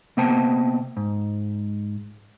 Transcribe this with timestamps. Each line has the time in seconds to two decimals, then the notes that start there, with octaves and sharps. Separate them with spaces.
0.17 C3 A#3 B3 C5 G5 A5
0.97 G#2